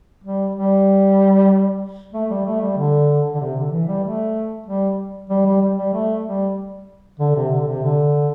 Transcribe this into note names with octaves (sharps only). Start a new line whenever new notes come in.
G3
G3
A3
G3
A3
G3
D3
D3
C3
D3
E3
G3
A3
G3
G3
G3
G3
G3
A3
G3
D3
C3
D3
C3
D3